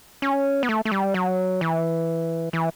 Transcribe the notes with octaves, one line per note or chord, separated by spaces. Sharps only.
C#4
B3
A3
A3
G3
F#3
E3
E3